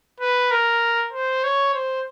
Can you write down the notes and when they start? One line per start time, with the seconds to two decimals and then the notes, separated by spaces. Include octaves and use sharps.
0.20 B4
0.51 A#4
1.13 C5
1.44 C#5
1.74 C5